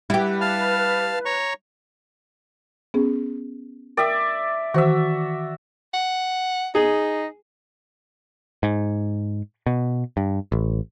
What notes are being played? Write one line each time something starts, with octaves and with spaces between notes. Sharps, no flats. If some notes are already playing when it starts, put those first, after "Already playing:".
G3 E4 G4 B4
F5 A5 F6
C#5 A#5 C#6
B3 C#4 G#4
A#4 D5 E5 G5 D#6
D#3 E3 F#4 C5 E5
F#5
D#4 G#4
G#2
B2
G2
A1